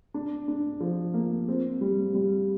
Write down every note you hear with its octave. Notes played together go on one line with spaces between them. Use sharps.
D4
D4
F3
A#3
C4
G3
G3